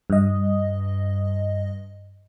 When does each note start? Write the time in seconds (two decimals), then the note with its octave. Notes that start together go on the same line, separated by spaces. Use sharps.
0.10 G2 D#5